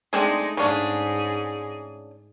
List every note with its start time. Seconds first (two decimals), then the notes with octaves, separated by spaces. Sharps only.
0.13 G#3 A3 C4 D4 D#4 G#4
0.57 G#2 C#3 C#4 D4 G#4